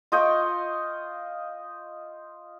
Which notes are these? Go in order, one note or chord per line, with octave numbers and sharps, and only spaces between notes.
F4 D#5 G5 C#6